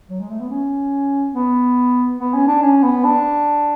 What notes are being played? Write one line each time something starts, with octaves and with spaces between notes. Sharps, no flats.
F#3
G#3
A3
B3
C#4
B3
B3
C#4
D4
C#4
B3
D4